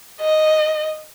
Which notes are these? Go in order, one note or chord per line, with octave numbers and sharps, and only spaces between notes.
D#5